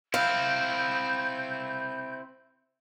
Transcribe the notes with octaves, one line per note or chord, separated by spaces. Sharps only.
C4 E4 F5 G6